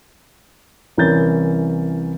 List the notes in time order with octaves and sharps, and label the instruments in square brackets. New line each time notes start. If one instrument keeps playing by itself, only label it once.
[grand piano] C2 E3 C#4 A#4 G6 A6